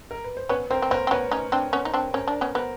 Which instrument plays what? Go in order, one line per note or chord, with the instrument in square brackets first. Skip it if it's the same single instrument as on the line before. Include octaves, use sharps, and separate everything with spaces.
[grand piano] A#4
B4
C5
[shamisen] B3 C#4 [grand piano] B4 C#5
[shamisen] C4 [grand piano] A#4 C5
[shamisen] C4
[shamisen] B3 C#4 [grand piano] A#4 C5
[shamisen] C4
[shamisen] B3 C#4 [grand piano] B4 C#5
[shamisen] C#4 D#4
C4 D4
B3 C#4
D#4
C4 D4
[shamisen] C#4 [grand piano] A#4 C5
[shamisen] D4
B3 C#4
[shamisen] B3 [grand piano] A#4 C5